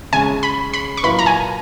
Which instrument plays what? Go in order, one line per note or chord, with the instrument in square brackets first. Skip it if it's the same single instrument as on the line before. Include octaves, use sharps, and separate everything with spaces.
[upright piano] C#3 G#3 C#4 [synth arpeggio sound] G#5
[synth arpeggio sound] B5
B5
C#6
[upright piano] A#2 F#3 A#3 E4 B4 [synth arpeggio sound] B5
[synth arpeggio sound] A#5
G#5